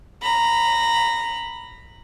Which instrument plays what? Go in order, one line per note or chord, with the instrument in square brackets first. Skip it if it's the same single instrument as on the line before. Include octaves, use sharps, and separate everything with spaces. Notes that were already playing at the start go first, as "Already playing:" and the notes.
[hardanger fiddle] A#5 B5